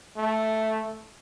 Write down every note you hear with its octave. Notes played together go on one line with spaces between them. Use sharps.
A3